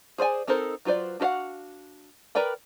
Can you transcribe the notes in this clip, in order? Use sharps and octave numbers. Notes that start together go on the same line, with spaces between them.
G#4 C5 D5 G#5
C4 D#4 A4 A#4 C5
F#3 F4 B4 C5 D5
D4 F#4 A4 F5 F#5
A#4 B4 D5 G5 B5